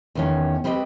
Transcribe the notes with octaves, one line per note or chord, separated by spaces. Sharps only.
E2 D#3 C#4
G3 C4 G4 B4 D#5